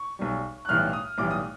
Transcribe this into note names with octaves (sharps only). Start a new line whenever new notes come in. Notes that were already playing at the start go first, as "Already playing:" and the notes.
Already playing: C#6
B1 B2 G3
F#6
B1 A2 E3 G3 F6
D#6
B1 A2 E3 G3 D6
D#6